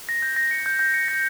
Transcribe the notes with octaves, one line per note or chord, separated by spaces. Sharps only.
A#6
G6
A#6
C#7
G6
G6
C#7
A#6